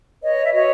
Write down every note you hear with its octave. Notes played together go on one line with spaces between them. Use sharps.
B4 C#5 D#5
E5
F#4 C#5 D#5